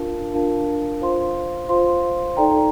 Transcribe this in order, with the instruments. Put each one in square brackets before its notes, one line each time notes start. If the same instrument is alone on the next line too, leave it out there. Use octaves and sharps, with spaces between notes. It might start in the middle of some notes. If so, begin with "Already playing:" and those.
Already playing: [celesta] D4 F4 A#4 F5 A5
D4 F4 A#4 F5 A5
F4 C5 F5 C6
F4 C5 F5 C6
D#4 A4 D5 G5 A#5